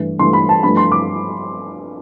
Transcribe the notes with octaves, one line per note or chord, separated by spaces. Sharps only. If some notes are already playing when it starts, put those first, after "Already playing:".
Already playing: G2 E3 A3
G2 E3 A3 C6
B5
A5
G2 F3 A3 B5
C6
D6